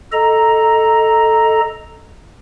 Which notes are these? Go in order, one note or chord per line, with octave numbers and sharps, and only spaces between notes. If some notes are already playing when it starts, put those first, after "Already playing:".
A4 D#5 A#5